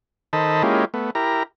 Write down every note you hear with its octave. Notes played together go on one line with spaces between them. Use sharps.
D#3 A4 C5 D#5 A5 B5
G#3 A#3 C#4 E4 F4 G4
A3 B3
E4 G4 A#4 A#5